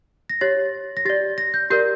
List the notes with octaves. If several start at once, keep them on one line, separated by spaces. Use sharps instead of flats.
A#6
G4 C#5 A6
A#6
G4 D5 A6
A#6
G6
G4 A#4 D5 G6